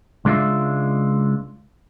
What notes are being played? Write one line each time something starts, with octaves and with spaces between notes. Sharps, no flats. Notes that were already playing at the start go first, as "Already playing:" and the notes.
C#2 G#3 D4 F4 E5